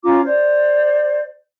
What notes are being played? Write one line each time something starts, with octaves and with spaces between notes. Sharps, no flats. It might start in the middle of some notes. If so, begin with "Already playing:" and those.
C#4 F4 A#5 D6
C5 D5